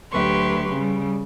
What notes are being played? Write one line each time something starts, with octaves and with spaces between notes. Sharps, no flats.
D2 F#3 G4 B4 C6 C#6
C#3 G3